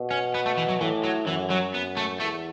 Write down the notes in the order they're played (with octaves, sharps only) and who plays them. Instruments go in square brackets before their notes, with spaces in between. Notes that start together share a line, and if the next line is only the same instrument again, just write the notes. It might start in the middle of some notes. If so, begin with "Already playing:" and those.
Already playing: [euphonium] B2
[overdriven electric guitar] C#4
B3
A3
E3
F#3
[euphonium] A2 [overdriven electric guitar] E3
[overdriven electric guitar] F#3
[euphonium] F#2 [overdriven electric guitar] E3
[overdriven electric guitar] F#3
B3
A3
[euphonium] E2 [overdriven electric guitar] A3